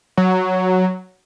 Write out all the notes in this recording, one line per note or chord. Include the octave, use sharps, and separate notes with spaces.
F#3